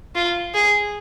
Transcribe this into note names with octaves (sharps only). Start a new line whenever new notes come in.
F4
G#4